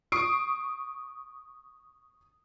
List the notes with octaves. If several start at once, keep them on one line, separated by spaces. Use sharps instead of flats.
C#6 D#6 C7 D7